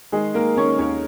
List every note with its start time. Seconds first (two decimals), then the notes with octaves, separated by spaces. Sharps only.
0.12 D#3 G#3 G#4
0.34 D#3 A#3 A#4
0.56 D#3 C#4 C#5
0.79 D#2 C#4 C#5